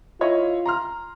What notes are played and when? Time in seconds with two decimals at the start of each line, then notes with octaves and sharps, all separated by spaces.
0.21 E4 F4 C#5 D#5
0.66 A#5 C6 F6